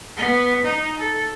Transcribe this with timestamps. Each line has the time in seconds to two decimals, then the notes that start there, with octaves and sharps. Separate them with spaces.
0.17 B3
0.64 D#4
0.98 A4